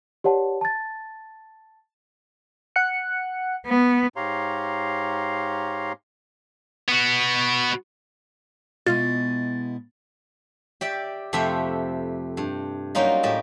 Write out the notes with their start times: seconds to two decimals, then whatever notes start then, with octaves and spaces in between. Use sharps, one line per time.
0.24 G4 B4 C#5 D5 F#5 A5
0.61 A5 A6
2.76 F#5 F#6 C#7
3.66 B3
4.16 G#2 G4 C#5 F5 A#5 C6
6.88 B3 F#4
8.86 B2 G#3 E4 F4 A6
10.81 G4 D5 E5
11.33 F2 C3 A3 G4 E5
12.37 G2
12.95 F#3 G3 A#3 C#4 D#4 F4
13.23 A2 G4 D#5 A5